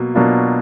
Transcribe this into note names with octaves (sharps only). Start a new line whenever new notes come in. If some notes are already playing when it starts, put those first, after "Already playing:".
Already playing: B2 F#3 A#3
B2 F#3 A#3 D4 F4